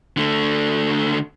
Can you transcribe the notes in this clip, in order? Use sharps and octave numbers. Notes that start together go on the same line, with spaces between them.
D3 A3